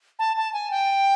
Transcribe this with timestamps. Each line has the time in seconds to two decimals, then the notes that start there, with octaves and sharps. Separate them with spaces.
0.19 A5
0.37 A5
0.53 G#5
0.71 G5